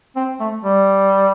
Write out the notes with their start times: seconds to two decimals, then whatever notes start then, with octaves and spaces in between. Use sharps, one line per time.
0.16 C4
0.40 A3
0.64 G3